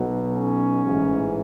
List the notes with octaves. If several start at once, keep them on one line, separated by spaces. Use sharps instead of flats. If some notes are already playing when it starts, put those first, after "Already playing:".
Already playing: B1 B2 F#3
C#4
A1 G#2 E3